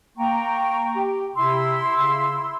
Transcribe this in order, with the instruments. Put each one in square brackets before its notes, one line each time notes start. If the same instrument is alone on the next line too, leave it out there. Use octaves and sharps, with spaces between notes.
[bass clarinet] A#3 [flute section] G5 A#5 C#6
[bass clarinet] G4
[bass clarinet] C3 [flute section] E4 C6 E6
[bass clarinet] C#3